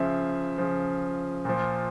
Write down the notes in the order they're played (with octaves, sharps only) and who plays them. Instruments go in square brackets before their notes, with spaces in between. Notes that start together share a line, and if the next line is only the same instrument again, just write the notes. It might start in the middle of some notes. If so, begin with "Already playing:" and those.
Already playing: [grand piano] C#3 F3 E5
C#3 F3
A#2 F3